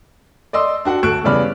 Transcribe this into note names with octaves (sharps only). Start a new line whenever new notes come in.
D5 D#5 C6 E6
D4 F#4 F#5
D2 A4 C#6 F#6 D7 E7
E2 G2 C#3 D5 B5 F6